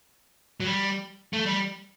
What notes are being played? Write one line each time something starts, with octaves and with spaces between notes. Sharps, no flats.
F#3
G3
A3
G3